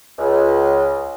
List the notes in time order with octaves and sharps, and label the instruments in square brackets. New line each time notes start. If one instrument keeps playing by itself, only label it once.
[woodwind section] C#2